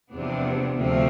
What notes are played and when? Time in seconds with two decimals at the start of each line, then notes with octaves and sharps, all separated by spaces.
0.12 E2 C3 F3 B3 D4
0.75 D2 C3 F3 A3 C4